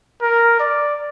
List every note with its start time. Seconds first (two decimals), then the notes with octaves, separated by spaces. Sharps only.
0.22 A#4
0.60 D5